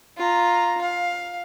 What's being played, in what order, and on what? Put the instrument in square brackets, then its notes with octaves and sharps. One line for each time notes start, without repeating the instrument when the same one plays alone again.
[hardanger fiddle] F4 A#5
F5